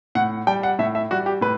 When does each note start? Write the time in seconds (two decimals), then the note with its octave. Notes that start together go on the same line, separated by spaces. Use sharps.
0.15 A2 F#5
0.47 G3 G5
0.63 F#5
0.79 A2 E5
0.95 E5
1.11 G3 F#4
1.26 G4
1.41 A2 B4